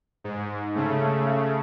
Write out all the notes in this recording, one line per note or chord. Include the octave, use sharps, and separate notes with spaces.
G#2
C#3 A3